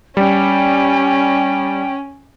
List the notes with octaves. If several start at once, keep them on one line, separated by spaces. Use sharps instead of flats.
G3 C#4 G5